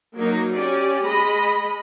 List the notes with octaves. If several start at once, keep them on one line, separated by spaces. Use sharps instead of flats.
F#3 A#3 D#4 A#4
C#4 G4 D5
G#3 D#5 B5